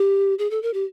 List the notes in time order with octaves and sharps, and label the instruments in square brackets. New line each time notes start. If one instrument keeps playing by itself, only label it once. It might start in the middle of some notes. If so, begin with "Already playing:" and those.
Already playing: [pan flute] G4
G#4
A4
A#4
G4